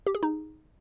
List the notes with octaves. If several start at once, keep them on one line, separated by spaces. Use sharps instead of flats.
G4
G#4
D#4